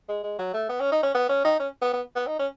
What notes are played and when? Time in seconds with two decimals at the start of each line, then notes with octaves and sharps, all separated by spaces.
0.09 G#3
0.23 G#3
0.39 F#3
0.54 A3
0.69 B3
0.80 C#4
0.92 D#4
1.03 C#4
1.15 B3
1.29 C#4
1.44 D#4
1.60 C#4
1.82 B3
1.94 B3
2.16 B3
2.27 D#4
2.39 C#4